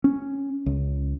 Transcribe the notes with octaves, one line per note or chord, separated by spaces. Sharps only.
C#4
C#2